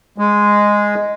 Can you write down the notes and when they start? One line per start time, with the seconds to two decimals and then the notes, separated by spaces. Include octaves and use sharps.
0.18 G#3